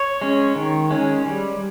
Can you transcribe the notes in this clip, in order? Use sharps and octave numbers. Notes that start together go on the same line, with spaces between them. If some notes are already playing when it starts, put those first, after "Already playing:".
Already playing: C#5
G#3 C#4
D#3
G#3 C#4
G3